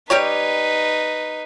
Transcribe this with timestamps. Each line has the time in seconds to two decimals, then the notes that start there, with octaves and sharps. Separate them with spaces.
0.10 G3 D#4 G4 B4 C#5